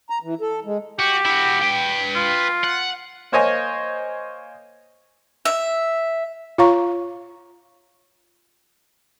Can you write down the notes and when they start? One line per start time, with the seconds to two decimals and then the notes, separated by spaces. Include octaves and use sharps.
0.10 A#5
0.23 E3
0.41 A4
0.65 G#3
0.99 F#4 G4
1.25 E4 F#4
1.62 B4 G5
2.15 F4
2.64 F#5
3.32 A#3 C5 C#5 D#5 G#5
5.45 E5
6.58 F4 C#5 F5 A#5 C#6